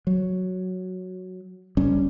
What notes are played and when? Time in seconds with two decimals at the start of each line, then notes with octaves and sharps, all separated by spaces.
0.07 F#3
1.77 F#1 G3 C#4